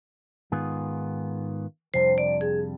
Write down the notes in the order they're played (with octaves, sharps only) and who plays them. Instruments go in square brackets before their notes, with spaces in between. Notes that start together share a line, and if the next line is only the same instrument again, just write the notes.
[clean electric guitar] G#2 D#3 B3 F4 G#4
[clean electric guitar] F2 C3 G3 D4 [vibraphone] C5
[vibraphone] D5
G#4